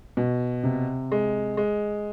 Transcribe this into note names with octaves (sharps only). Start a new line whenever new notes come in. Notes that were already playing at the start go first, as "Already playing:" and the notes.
B2
C3
G#3
G#3